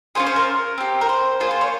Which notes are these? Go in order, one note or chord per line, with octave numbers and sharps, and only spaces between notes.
C#4 F4 G#4 C5
C5
A#4
C4 G4
A#4
C5
A#3 F4 G#4 C5
C5
C#5